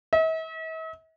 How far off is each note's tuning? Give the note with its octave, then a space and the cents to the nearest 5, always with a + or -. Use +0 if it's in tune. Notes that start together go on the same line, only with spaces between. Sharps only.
E5 -45